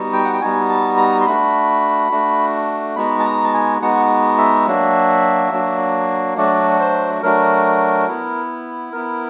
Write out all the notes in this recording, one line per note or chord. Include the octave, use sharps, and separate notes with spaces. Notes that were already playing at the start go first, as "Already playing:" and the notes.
Already playing: G3 B3 D#4 F#4
G5
F#5
G5
G3 B3 D#4 F#4 G#5
A5
A#5
C6
A3 D4 F#4 B5
A3 D4 F#4
G#3 B3 D#4 F#4 B5
A5
A#5
A5
G#5
G#3 B3 D#4 F#4 F#5
E5
F#3 A#3 D4 F#4
F#3 A#3 D4 F#4
F#3 A3 D4 F#4 D5
C5
F#3 A3 D4 F#4 A#4
B3 E4
B3 E4 A#4